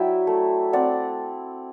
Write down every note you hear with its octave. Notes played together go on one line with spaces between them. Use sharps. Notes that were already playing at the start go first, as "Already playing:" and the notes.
Already playing: F#3 E4 D5 E5 G5
A3
C4 D5 F#5